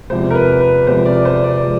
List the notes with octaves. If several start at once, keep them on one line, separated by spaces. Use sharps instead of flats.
E2 C3 F3 G#3 C5
A#4
B4
B4
E2 C3 F3 G#3 C5
D5
C5
D5
F3 G#3